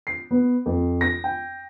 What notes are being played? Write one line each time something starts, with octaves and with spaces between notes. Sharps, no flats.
C7
B3
F2
A#6
G5